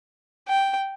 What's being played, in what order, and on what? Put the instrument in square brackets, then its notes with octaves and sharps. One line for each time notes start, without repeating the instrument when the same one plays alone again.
[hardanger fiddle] G5